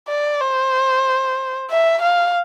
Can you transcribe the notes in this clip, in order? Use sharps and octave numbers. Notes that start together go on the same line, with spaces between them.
D5
C5
E5
F5